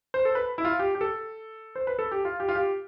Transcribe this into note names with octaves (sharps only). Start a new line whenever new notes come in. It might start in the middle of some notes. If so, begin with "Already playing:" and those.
C5
A4
B4
E4
F4
G4
G4
A4
C5
B4
A4
G4
F4
G4
F4
G4